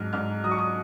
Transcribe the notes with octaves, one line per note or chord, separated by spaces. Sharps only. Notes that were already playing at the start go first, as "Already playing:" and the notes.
Already playing: G#2 F#3 F6
G#2 F6
F#3 D#6
C#6
D#6